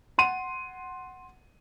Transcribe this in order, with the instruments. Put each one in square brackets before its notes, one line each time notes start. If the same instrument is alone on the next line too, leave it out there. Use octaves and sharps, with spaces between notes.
[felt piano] F#5 C6 D#7